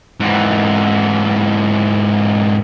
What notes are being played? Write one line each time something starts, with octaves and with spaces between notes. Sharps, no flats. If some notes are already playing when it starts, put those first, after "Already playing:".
G#2 E3